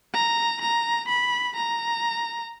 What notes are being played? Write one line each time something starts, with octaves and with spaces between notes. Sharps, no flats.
A#5
A#5
B5
A#5